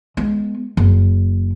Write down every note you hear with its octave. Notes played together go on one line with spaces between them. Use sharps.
G#3 B3
F#1